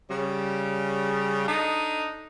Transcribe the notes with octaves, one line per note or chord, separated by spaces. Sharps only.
C#3 G3
D4 D#4 A4 D#5